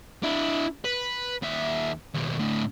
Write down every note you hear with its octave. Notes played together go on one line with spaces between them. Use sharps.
D4 E4
B4
D#2 E5
D#2 B2
A2 D3